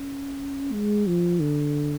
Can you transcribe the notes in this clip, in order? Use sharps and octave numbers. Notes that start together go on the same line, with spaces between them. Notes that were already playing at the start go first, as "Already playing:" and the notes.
Already playing: C#4
G#3
F3
D3